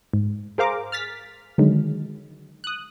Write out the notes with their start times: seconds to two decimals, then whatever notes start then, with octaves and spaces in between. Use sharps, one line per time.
0.14 G#2
0.58 G#4 A#4 C5 F5 A#5 D6
0.92 F6 A6 B6
1.58 D3 D#3 F#3 G#3
2.64 D#6 F#6